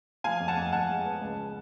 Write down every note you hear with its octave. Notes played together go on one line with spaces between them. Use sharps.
F3 F5 G#5
F2
F#5 A5
F2
F2 F#5 A5
G#3
B3
C#2